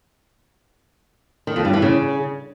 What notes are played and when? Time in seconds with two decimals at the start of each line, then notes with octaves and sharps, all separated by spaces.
1.47 D#3
1.56 F2
1.65 G2
1.73 E3
1.82 C#3